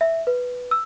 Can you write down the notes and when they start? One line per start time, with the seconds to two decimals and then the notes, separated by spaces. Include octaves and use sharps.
0.01 E5
0.27 B4
0.71 E6